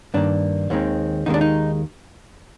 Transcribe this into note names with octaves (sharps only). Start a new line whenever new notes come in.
G2 D#3 A#3 D4
D#2 D#3 G#3 C4
D#2 D#3 G#3 C4 D#4
D4
D#4